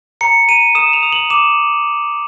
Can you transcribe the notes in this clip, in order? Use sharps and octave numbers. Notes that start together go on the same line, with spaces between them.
A#5 C#7
A#5 D#7
D#6 E7
F7
D#6
F#7
D6 E7